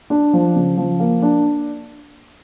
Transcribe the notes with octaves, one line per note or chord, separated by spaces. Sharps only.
D4
F3
C#3
F3
A#3
D4